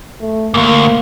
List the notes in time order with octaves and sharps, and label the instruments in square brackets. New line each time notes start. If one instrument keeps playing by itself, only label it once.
[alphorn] A3
[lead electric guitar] D2 G#2 [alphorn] A#3